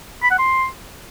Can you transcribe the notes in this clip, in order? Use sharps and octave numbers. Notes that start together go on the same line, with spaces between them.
B5
F#5
C6